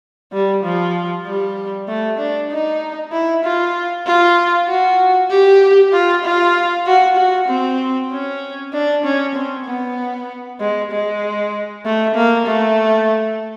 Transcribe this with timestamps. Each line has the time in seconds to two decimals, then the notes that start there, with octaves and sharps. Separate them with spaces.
0.33 G3
0.64 F3
1.26 G3
1.88 A3
2.19 D4
2.51 D#4
3.12 E4
3.44 F4
4.06 F4
4.68 F#4
5.30 G4
5.93 F4
6.24 F4
6.86 F#4
7.17 F#4
7.49 C4
8.11 C#4
8.73 D4
9.04 C#4
9.35 C4
9.66 B3
10.60 G#3
10.91 G#3
11.85 A3
12.15 A#3
12.46 A3